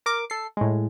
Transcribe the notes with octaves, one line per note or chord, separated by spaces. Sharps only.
A#4 D6
A4 C7
A2 G#3